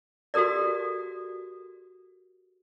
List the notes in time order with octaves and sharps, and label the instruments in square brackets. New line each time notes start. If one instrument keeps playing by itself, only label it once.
[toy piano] F#4 G4 A4 A#4 D5